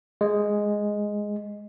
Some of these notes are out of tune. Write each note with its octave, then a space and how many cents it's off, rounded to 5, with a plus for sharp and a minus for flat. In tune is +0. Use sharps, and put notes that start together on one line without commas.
G#3 +0